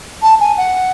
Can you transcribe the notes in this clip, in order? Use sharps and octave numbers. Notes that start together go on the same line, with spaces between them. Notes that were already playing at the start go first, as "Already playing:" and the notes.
A5
G#5
F#5